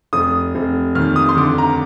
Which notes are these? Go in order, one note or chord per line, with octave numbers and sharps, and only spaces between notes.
F1 D#6
F1
D#2 F6
D#6
C6
D3 D6
A#5